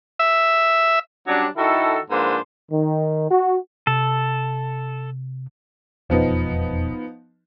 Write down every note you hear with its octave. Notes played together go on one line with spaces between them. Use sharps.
E5
F#3 G3 C#4 D4
D#3 D#4 E4 F#4 A4
G#2 F3 A#3 D4 B4 C5
D#3
F#4
C3 A4
E1 F2 B2 F3 B3 D#4